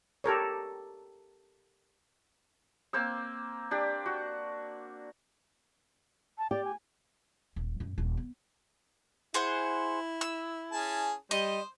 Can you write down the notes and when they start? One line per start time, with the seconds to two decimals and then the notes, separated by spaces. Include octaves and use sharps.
0.24 G4 A4 A#4 C#5
2.93 A#3 C4 C5 E6
3.71 D4 G4 D5
4.06 F#4
6.38 A5
6.51 G4 D5
6.65 G#5
7.56 D#1
7.80 F#2
7.98 D#1
8.17 B3
9.34 E4 G#4 C5 F#5
10.21 E6
10.72 C#4 G#4 A5
11.31 G3 C5 D#5